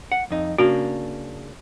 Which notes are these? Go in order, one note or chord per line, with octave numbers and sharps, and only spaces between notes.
F#5
F2 D#4
C#3 A#3 D4 F#4